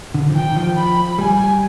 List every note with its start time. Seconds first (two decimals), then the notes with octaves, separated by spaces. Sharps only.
0.14 D3
0.29 F3
0.35 D#3 G5
0.56 F3
0.77 B5
1.18 G3 G#5